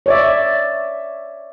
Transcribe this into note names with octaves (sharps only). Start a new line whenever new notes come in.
C#5 D5 E5